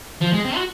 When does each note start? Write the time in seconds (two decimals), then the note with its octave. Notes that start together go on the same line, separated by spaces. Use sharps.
0.21 F3
0.33 G#3
0.45 C4
0.55 F#4